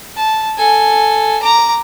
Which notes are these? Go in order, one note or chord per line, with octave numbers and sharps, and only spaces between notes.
A5
A4 G#5
A#5 D6